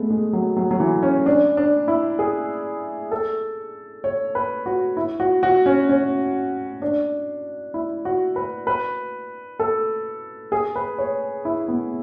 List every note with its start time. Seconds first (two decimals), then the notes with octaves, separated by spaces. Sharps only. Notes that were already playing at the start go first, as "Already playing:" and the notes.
Already playing: G#3 A3 B3
0.10 G#3
0.33 F#3
0.57 F#3
0.71 F#3
0.80 E3
1.03 C#4
1.26 D4
1.57 D4
1.88 E4
2.19 G#4
3.11 A4
4.04 C#5
4.35 B4
4.66 F#4
4.97 E4
5.20 F#4
5.43 F#4
5.66 C#4
5.89 C#4
6.82 D4
7.74 E4
8.05 F#4
8.36 B4
8.67 B4
9.59 A4
10.52 G#4
10.76 B4
10.98 C#5
11.45 E4
11.68 B3